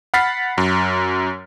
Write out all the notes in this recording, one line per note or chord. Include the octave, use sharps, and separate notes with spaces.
F#5 B5 F6 A6 B6 C7
F#2